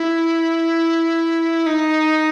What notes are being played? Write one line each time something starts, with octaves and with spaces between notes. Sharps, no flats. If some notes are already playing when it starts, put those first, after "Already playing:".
Already playing: E4
D#4